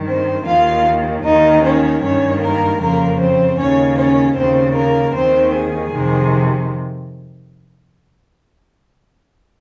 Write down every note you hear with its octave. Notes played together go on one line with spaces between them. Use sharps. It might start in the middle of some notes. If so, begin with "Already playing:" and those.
Already playing: G2 D#3
C4 C5
D#2 D#3 F4 F5
D#2 D#3 D#4 D#5
C#4 C#5
G2 D#3 C#4 C#5
A#3 A#4
F2 C#3 A#3 A#4
C4 C5
D#2 C#3 C#4 C#5
C#4 C#5
D#2 C#3 C4 C5
A#3 A#4
D#2 D#3 C4 C5
G#4
F2 C3 D#3